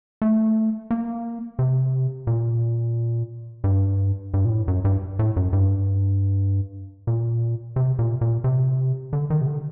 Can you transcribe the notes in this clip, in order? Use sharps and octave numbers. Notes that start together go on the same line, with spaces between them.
A3
A#3
C3
A#2
G2
G2
A#2
A2
F#2
G2
A2
F#2
G2
A#2
C3
A#2
A#2
C3
D3
D#3
C3
D3